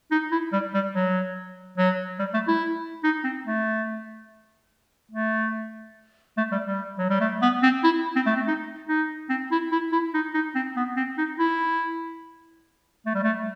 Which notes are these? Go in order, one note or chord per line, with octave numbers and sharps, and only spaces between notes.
D#4
E4
G3
G3
F#3
F#3
G3
A3
E4
D#4
C4
A3
A3
A3
G3
G3
F#3
G3
A3
B3
C4
E4
C4
A3
C4
D#4
D#4
C4
E4
E4
E4
D#4
D#4
C4
B3
C4
D#4
E4
A3
G3
A3